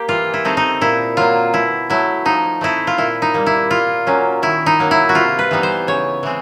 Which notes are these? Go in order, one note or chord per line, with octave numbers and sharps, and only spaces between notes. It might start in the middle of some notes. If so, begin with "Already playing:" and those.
Already playing: A#3 G4
E3 F4
E4
A3 C4 D#4
D#4
A#2 E4
F#3 A#3 F4
B2 E4
F#3 A3 E4
F3 D#4
A3 C4 D#4 E4
F4
A#2 E4
D#4
G3 A#3
E4
A#2 F4
F#3 A#3 C#4
D#3 E4
D#4
F#3 A#3
E4
F#4
C3 F4
B4
E3 G3 B3 D#4
C5
C#3 C#5
E3 G#3 C4